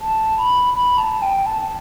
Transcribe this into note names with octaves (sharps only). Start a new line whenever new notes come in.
A5
B5
B5
A5
G5
A5